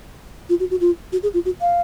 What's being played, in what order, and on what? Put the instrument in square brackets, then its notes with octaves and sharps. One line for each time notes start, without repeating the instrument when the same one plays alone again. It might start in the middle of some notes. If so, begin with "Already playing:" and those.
[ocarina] F4
F#4
F#4
F4
F#4
G#4
F4
F#4
F5